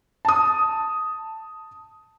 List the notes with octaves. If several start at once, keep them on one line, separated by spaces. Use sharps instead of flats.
A5 D#6